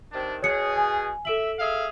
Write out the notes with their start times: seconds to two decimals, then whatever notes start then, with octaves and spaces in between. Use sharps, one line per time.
0.13 C3 D#3 D4
0.43 B2 G#4 C#5 C#7
0.77 G#5
1.25 A4 E5 D7 F#7
1.59 G#4 E5 F5